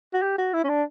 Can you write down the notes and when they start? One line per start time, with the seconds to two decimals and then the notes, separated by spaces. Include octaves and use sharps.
0.13 F#4
0.22 G4
0.38 F#4
0.53 E4
0.64 C#4
0.69 D4